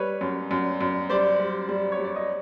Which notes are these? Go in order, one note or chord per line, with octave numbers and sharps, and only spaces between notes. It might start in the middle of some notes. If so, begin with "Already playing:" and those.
Already playing: G3 B4 C#5
F#2
F#2
F#2
G3 C5 D5
G3
G3
C#5
G3
D5
D#5